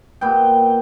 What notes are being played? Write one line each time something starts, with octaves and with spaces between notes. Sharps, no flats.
A#2 B3 G5